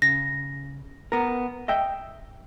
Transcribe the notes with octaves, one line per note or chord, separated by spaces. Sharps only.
C#3 A#6
B3 A#4
D#5 E5 G5